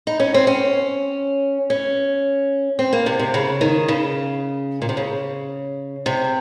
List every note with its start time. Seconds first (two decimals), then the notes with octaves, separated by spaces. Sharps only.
0.07 D#4
0.20 C#4
0.34 C4
0.47 C#4
1.70 C#4
2.79 C4
2.93 A#3
3.06 C3
3.19 C3
3.34 C#3
3.61 D#3
3.88 C#3
4.82 A#2
4.89 C3
4.97 C#3
6.06 C3